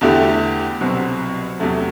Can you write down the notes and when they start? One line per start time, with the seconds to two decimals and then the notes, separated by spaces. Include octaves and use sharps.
0.01 E2 D3 A3 E4 G4
0.81 C2 B2 F#3 C4 F#4
1.60 E2 C3 F#3 A3